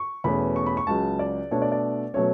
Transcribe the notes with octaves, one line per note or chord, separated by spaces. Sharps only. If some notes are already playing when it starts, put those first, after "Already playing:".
Already playing: C#6
E2 B2 A3 C#4 B5
C#6
B5
C#6
C#2 C#3 F#3 A5
D5
B2 A3 D4 C#5
D5
D5
B2 F#3 A3 C#4 C#5